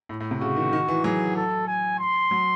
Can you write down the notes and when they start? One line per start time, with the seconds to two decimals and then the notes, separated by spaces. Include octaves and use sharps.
0.09 A2
0.20 A2
0.31 C3
0.41 C#3 F#4
0.56 D#3
0.73 D#3
0.88 E3
1.04 F#3 G#4
1.36 A4
1.67 G#5
1.99 C6
2.31 F#3